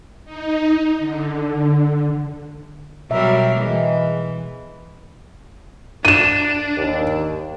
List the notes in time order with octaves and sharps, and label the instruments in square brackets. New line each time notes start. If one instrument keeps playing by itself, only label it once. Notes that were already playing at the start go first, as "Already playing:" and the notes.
[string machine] D#4
D3
[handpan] B2 E5 [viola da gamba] F#3 G3 A#4
[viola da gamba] E3 [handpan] G#3
[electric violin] D4 [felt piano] D#7 E7
[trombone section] D#2